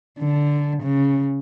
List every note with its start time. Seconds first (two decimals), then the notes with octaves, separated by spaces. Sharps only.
0.19 D3
0.82 C#3